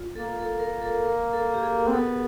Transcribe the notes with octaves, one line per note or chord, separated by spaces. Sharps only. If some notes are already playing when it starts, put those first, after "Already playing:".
Already playing: F4
A#3 A4
A4
A#4
A4
A#4
A4
G4
G#4
C4
B3 A4